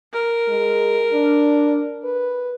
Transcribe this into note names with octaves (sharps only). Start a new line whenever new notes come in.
A#4
G#3
D4
B4